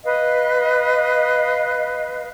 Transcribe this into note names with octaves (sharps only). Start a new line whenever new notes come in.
B4 D#5 F5